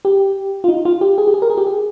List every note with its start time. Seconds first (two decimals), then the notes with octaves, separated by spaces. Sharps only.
0.05 G4
0.64 F4
0.68 D#4
0.85 F4
1.01 G4
1.18 G#4
1.27 G4
1.34 G#4
1.42 A#4
1.50 G#4
1.57 G4
1.67 G#4